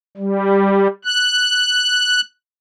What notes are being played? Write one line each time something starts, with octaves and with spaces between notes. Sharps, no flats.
G3
F#6